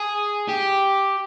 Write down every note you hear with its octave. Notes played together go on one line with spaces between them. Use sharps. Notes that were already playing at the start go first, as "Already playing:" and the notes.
Already playing: G#4
G4